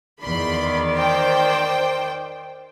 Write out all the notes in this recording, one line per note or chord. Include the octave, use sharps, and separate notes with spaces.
E2 D#3 D5 B5 C6
C5 G5